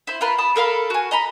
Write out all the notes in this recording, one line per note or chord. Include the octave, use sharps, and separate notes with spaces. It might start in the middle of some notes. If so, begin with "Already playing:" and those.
E4 C5
F4 A#4 B4
A5 B5 D#6
A4 A#4 F5 B5
F#4 G#5
D#5 A#5 B5